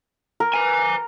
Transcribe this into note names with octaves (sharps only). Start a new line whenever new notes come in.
A#4
B4 G#5